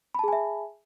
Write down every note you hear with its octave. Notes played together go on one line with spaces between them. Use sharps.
G#4 E5 G#5 A5 B5